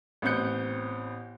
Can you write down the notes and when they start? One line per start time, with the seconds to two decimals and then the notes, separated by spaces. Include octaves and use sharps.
0.22 A1 B3 C4 F#6 G6 C#7